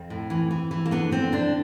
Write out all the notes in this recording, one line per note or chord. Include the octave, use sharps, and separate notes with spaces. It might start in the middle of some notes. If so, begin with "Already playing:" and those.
Already playing: F2 C4
A2
E3
E3
E3
A#3
D3 B3
D3 C4
D3 D4